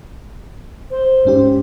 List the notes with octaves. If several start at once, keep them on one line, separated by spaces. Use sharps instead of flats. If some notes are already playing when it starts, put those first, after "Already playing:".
C5
G#2 C#4 G4